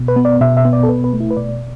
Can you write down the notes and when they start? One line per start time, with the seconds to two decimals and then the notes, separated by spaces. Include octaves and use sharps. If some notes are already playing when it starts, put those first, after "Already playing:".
Already playing: B2
0.08 B4
0.16 B3
0.25 D5
0.41 B2 E5
0.57 E5
0.65 B3
0.73 D5
0.83 A4
0.88 B2 B4
1.04 B4
1.13 A3
1.20 E4
1.30 B4
1.37 B2 D5